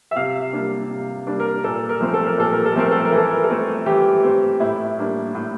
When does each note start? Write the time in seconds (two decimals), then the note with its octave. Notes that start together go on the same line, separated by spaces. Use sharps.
0.11 E5
0.16 C3 F5
0.53 G3 A#3 D4
0.90 C3
1.27 G3 A#3 D4
1.40 A#4
1.64 A#2 A4
1.89 A#4
2.01 F3 A3 C4
2.14 A4
2.27 A#4
2.38 A#2 A4
2.53 A#4
2.66 A4
2.76 F3 A3 C4 A#4
2.91 A4
3.05 A#4
3.12 E3
3.18 A4
3.31 A#4
3.44 A4
3.49 A3 C4
3.86 E3 G4
4.23 A3 C4
4.60 A2 E4
4.98 G3 A#3 D4
5.35 A2